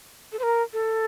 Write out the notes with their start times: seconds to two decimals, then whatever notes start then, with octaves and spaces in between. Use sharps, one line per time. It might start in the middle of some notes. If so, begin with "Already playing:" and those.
0.32 A4
0.39 C5
0.43 A#4
0.73 A4